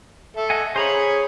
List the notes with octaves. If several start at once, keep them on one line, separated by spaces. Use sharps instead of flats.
A4 E5
D#5 F#5 G#5
G#4 C5 C#5 G#5 A#5 B5